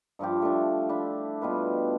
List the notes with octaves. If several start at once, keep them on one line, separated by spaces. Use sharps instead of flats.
G2 F3 F4 G4
A3 D4
D4 E4
B2 G3 F4 B4